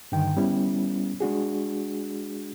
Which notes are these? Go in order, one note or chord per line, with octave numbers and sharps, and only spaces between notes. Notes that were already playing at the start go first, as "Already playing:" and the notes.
G2 D3 D#3 G5
G3 B3 C#4 E4
G#3 D4 F#4 G#4